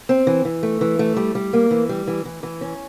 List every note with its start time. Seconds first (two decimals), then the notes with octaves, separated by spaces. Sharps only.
0.09 C4
0.27 E3
0.45 E3
0.63 A3
0.81 E3
0.99 A3
1.16 G3
1.35 G3
1.53 A#3
1.71 E3
1.89 G3
2.07 E3
2.25 E3
2.43 E3
2.61 C#4